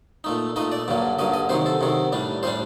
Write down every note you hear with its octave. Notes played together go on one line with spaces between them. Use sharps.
A#2 A3 D#4
A#2 A3 D#4 D#5
D5
G2 D3 F#3 A#3
G2 D3 F#3 A#3 D#5
D#5
C3 D#3 F#3 C5
A4
C3 D#3 F#3
A2 G3 D4
A2 G3 D4 C5